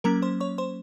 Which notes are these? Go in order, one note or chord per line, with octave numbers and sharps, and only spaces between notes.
F#3 A#3 C#4 A#4 A#5
C5 C6
C#5 C#6
C5 C6